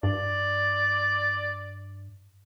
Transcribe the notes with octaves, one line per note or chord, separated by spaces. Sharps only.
G2 D5